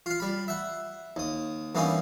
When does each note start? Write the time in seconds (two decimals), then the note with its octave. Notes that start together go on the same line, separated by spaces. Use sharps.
0.06 F4 F5
0.20 G3 B5
0.48 E5 F#5
1.16 D#2 D#6
1.75 G2 E3 A#3 B3 C#4 D#4